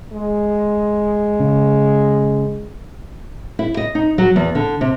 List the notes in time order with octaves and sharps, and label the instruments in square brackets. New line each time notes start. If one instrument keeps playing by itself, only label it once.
[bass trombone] G#3
[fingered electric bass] C#3
[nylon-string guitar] E4
D#5
D#4
F#3
E2
D3
C3